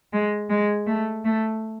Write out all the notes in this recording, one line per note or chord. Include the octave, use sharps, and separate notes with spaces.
G#3
G#3
A3
A3